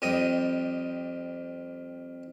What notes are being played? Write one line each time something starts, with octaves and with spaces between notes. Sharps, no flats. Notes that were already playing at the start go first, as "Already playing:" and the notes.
F2 G3 D#5 D#6